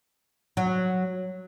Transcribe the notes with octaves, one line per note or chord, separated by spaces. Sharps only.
F#3